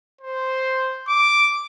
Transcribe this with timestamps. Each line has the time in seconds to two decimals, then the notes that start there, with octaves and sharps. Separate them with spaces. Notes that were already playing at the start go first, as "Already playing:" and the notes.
0.21 C5
1.08 D6